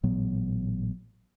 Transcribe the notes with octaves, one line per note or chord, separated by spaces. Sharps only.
A1 A#2 F#3 B3